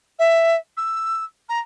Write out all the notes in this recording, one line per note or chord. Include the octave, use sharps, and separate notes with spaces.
E5
E6
A#5